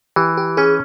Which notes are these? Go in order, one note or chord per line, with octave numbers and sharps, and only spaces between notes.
E3 G4
G4
C#4 G#4